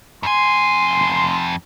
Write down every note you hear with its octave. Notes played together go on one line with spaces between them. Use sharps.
F2 G#5 C6